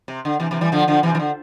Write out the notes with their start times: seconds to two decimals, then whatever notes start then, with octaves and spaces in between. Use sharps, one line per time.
0.08 C3
0.25 D3
0.40 C3 E3
0.51 C3 E3
0.61 E3 G3
0.72 D3 F3
0.88 D3 F3
1.03 C3 E3
1.15 E3
1.20 D3